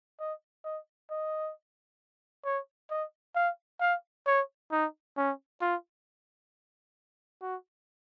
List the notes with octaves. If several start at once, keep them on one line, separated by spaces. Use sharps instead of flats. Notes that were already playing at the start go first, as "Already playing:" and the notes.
D#5
D#5
D#5
C#5
D#5
F5
F5
C#5
D#4
C#4
F4
F#4